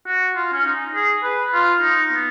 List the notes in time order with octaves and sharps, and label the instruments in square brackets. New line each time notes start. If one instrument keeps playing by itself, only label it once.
[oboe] F#4
F4
C#4
D#4
G#4
B4
F4
D#4
B3